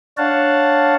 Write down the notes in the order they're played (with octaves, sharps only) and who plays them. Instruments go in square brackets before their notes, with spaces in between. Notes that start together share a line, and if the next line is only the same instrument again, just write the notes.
[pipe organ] D4 C#5 F5 F#5 A5